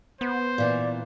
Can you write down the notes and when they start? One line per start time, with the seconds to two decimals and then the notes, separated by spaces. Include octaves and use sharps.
0.21 B3 C5
0.58 A#2 E3 D5